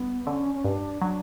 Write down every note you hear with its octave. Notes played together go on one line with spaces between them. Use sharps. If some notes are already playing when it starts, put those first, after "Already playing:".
Already playing: G1 B3
D3 C#4
C#4
G2 D4
F#3 D4